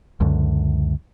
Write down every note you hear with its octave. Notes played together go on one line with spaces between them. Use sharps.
C#2 F#2 D3